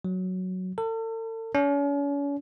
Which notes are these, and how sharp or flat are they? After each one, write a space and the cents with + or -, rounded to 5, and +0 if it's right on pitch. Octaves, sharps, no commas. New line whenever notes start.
F#3 +0
A4 +40
C#4 +40